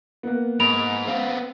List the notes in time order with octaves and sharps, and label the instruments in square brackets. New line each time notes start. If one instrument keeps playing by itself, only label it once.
[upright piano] A#3 B3
[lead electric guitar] G#2 [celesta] B5 D7 F7
[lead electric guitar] B3 C4 [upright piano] F5